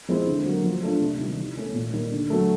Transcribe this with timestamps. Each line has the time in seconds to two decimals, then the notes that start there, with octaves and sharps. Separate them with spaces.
0.09 F3 G#3 C4 E4
0.27 D3
0.46 F#3 A#3
0.64 F3
0.83 A3 D4 F4
1.01 C3
1.19 D#3 G3
1.38 E3
1.56 A3 C#4 E4
1.74 A#2
1.93 G3 A#3 D#4
2.11 D3
2.30 F#3 A3